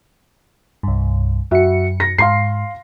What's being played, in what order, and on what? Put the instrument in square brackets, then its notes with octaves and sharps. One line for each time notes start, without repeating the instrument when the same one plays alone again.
[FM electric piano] C2 G2
[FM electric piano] F#2 C#7 [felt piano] F#4 E5
[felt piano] A#6
[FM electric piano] G#2 [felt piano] F5 C6 C7